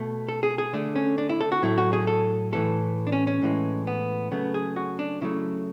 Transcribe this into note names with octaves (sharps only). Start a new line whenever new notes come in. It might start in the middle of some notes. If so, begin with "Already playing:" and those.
Already playing: B2 A3
A4
G#4
G#4
D3 A3 D4
C#4
D4
E4
A4
F#4
A2 F#3 A3 E4
F#4
G#4
A4
A2 E3 A3 A4
D4
C#4
C#4
A2 E3 G#3
B3
C#3 F#3 A3 B3
G#4
F#4
D4
C#3 F#3 A3 E4